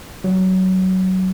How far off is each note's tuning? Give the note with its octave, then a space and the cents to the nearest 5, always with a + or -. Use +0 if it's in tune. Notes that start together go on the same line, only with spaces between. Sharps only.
F#3 +15